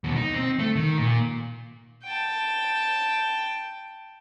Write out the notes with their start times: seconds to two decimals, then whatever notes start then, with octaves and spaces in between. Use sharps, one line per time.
0.04 D#2 B2
0.16 D#4
0.34 C4
0.59 A3
0.76 D#3
0.98 A#2
2.04 G5 A5